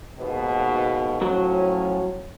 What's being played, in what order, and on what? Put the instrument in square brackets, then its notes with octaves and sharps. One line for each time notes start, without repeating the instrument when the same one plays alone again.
[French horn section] D#2 G#2 B2
[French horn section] A2 F3 C#4 [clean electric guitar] F#3